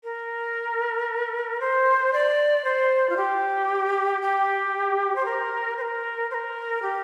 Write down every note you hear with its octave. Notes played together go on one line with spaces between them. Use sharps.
A#4
C5
D5
C5
F4
G4
G4
C5
A#4
C5
A#4
C5
A#4
G4